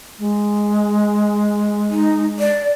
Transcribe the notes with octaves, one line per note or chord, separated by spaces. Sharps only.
G#3
D#4
D5